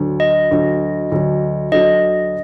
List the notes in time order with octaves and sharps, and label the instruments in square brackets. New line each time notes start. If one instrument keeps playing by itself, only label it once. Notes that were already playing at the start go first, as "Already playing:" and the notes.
Already playing: [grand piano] D2 D3 F#3
[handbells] D#5
[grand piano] D2 D3 F#3
D2 D3 F#3
[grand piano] D2 D3 F#3 [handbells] D#5